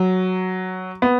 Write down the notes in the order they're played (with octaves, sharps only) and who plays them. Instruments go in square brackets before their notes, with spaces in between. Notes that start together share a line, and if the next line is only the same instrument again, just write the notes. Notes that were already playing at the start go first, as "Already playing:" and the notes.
Already playing: [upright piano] F#3
B3